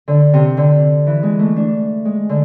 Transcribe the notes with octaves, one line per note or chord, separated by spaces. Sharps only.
D3
C3
D3
E3
G#3
A3
D4
G#3
D3